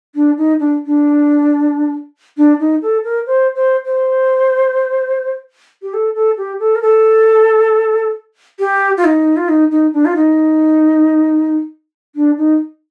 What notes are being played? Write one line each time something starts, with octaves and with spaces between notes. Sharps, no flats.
D4
D#4
D4
D4
D4
D#4
A4
A#4
C5
C5
C5
G4
A4
A4
G4
A4
A#4
A4
G4
F4
D#4
F4
D#4
D#4
D4
F4
D#4
D4
D#4